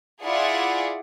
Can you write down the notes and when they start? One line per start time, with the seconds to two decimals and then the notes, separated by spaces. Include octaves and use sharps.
0.24 E4 F4 G#4 D5 F#5